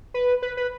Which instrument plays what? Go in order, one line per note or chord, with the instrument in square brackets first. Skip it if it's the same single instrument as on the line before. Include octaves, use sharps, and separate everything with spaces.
[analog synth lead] B4
B4
B4